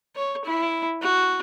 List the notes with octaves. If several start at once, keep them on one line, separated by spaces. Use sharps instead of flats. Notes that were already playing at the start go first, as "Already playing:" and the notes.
C#5
E4
F#4